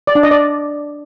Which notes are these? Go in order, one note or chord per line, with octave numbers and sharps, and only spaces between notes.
D5
D4
D#5
D5